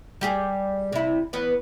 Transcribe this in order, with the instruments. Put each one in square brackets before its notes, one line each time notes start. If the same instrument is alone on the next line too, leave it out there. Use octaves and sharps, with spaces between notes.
[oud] G3 G4 G#4
C3 E4
E2 B3 B4